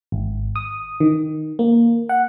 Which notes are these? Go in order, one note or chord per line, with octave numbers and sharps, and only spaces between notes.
G#1
D#6
D#3
A#3
F#5